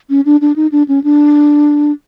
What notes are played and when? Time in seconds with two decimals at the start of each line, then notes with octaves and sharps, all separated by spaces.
0.10 C#4
0.26 D4
0.41 D4
0.56 D#4
0.72 D4
0.89 C#4
1.04 D4